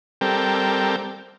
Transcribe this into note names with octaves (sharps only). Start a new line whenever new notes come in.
G3 C4 A4 A#4 G5